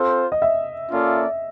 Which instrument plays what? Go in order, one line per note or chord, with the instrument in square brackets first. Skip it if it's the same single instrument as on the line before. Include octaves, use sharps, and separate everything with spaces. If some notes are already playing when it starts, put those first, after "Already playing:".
Already playing: [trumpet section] C4 F4 A4 C5
[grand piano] D#5
E5
[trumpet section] A#3 C#4 F4 A4 D5